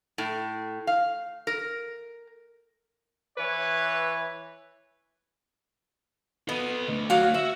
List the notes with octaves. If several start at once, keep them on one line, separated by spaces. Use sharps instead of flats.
A2
F5
A#4
E3 B4 C#5
B3 A4 D#5
D2 A3
F#3 F#4 F5
F#4 E5